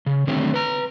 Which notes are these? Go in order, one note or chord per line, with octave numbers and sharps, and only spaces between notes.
C#3
D3 D#3 F#3 G3 A3 C4
B4 A#5